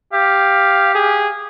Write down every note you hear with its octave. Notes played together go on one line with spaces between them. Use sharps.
G4 F5
G#4